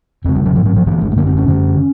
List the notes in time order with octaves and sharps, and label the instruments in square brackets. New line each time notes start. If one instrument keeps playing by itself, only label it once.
[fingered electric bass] F2 C#3 C4
G3
F#3
G#2 F3
F#3
F3
G2 D3 E3
G#3
A3
F#2 D3 A#3
C4
C#4
F#2 D3